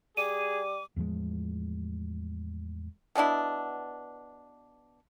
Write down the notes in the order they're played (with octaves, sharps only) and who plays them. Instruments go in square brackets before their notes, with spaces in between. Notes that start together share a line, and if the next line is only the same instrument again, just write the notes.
[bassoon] G3 [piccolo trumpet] G#4 [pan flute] D6 [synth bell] D#7
[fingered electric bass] E2 A2 F3 G#3
[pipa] B2 B3 D4 E4